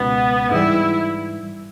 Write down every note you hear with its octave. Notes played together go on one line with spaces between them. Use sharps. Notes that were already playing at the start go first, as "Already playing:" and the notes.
Already playing: C#2 B2 G#3 B3 C#4
G#2 E3 G3 E4